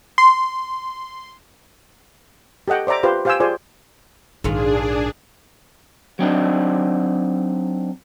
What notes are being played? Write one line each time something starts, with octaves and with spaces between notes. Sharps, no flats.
C6
G4 A4 D#5 F#5 G5
C5 D5 E5 A#5 D6
F4 G4 B4 C5
G4 C5 F5 G5 G#5 E6
F4 G#4 C5 D5 G#5
A#1 G#2 D#3 D4 F4 G#4
F#3 C4 D4 D#4